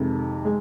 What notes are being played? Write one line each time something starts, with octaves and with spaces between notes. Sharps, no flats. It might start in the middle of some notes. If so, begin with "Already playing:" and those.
Already playing: F2 C3 D#3 G#3
G#3